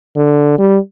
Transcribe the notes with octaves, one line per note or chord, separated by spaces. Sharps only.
D3
G3